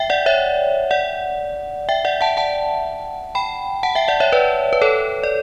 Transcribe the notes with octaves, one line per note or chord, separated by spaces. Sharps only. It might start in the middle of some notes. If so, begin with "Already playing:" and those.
Already playing: E5 G5
D5 F#5
C#5 E5
D5 F#5
E5 G5
D5 F#5
F#5 A5
F#5 A5
G5 B5
F#5 A5
E5 G5
D5 F#5
C#5 E5
B4 D5
B4
A4 C#5
D5